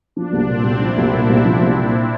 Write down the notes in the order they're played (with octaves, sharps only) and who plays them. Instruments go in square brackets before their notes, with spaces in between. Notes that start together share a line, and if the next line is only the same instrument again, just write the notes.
[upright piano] F3 [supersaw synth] D4
[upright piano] C2
[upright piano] A#2 [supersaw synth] C4
[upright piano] C2
[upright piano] F3 [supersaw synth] E4
[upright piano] C2
A#2
C2
F3
C2
A#2